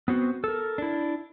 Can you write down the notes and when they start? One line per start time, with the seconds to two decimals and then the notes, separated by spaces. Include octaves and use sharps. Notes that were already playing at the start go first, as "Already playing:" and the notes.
0.08 B3 C4 F#4
0.44 A4 A#4
0.78 D4 E4